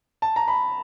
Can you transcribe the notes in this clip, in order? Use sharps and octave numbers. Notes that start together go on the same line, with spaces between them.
A5
A#5
B5